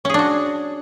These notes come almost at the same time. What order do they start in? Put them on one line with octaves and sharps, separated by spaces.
C#4 G#4 D4 F#4